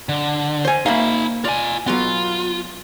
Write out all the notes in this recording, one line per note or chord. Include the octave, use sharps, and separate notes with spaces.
D3
C5 G#5
A#3 D#4 E5 F5 B5
F4 D5 G#5
F#3 B3 F4